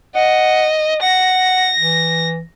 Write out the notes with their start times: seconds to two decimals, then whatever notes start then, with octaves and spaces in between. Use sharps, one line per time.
0.15 D#5 F#5
1.02 F#5 A#6
1.79 E3